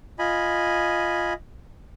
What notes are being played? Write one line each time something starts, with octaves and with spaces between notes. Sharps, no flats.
F4 D#5 G#5 B5